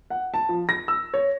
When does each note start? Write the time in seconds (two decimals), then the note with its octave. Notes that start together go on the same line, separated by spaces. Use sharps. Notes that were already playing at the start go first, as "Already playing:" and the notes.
0.10 F#5
0.34 A5
0.49 F3
0.69 A#6
0.88 E6
1.14 C#5